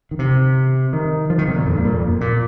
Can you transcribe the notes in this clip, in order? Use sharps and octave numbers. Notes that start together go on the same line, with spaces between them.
D#3
C3
D#3
F3
D#3
C3
A#2
F2
G2
A#2
F2
A#2